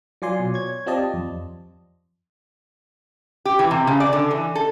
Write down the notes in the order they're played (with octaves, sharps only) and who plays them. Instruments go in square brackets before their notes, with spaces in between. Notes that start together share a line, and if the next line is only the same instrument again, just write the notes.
[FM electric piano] F#3 F4 D5 G#5 C6
B2
C#5 G#6
C4 F4 G4 D5 D#5 A5
F2
[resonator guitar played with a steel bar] G4
E3
C3
C#3
D5
D3
E3
A4